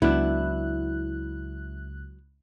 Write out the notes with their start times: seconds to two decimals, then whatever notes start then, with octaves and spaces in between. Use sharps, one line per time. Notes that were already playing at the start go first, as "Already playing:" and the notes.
0.02 C#2 F#3 B3 D4 E4 F#6